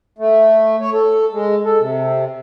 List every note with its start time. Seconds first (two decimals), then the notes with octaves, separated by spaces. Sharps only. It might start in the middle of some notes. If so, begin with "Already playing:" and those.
0.18 A3
0.81 C#5
0.93 A4
1.32 G#3
1.64 A4
1.80 C3